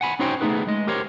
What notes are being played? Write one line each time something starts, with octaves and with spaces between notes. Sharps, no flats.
F#5 G#5 B5
C#4 D#4 F#4 C5 C#5 G5
A3 B3 D#4 G#4 B4
G#3 D#5
G4 A#4 C5 C#5